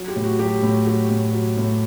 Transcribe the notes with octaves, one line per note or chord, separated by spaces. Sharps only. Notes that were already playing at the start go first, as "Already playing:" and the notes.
Already playing: F#3
G4
A2
F#4
F#3 G4
A2
F#3 G4
A2
F#3
A2